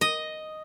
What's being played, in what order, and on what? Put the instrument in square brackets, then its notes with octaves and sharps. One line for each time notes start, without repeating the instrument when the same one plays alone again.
[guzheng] D#5